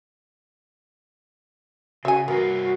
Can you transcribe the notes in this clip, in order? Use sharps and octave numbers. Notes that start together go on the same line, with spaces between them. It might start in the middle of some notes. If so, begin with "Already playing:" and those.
C#3 F#4 E5 G#5
G2 B3 C4 F#4 A#4